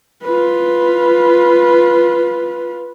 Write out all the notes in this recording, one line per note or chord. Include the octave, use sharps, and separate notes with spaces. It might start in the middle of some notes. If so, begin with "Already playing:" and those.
F4 B4